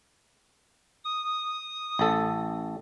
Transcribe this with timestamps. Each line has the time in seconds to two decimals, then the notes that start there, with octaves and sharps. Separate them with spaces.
1.05 D#6
1.99 A1 A4